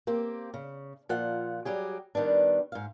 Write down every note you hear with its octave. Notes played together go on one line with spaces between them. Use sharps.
A#3 C4 G4
C#3
A#2 F3 F4 F#5
F#3 G3 G4 G#4
D#3 G3 B3 D4
G#2 F5